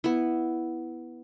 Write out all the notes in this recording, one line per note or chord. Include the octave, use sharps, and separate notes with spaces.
B3 E4